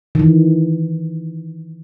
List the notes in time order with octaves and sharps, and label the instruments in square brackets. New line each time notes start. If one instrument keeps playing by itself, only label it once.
[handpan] D#3 E3